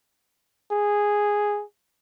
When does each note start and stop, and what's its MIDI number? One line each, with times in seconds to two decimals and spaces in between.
0.72 1.63 68